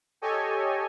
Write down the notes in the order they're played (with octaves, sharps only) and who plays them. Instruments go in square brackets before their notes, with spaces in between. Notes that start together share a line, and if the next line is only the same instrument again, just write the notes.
[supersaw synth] G4 A4 C#5 D#5 G#5